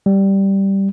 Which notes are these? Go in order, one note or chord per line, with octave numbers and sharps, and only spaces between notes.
G3